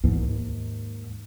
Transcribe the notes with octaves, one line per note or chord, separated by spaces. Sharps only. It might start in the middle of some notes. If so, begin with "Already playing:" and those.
D#2 G#2